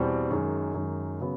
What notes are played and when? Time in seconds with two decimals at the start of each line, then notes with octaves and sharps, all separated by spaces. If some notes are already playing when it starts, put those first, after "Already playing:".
Already playing: E2 B2 G3 C4
0.30 F#2 D#3 G#3
0.74 F#2 D#3 G#3
1.20 C#3 F#3 B3